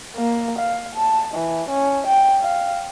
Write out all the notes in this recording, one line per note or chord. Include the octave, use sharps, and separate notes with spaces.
A#3
F5
A5
E3
C#4
G5
F5